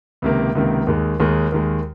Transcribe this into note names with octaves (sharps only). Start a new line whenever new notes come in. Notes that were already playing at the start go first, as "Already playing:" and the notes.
C#2 C3 D#3 A#3
C#2 C3 D#3 A#3
D#2 D#3 G#3
D#2 D#3 G#3
D#2 D#3 G#3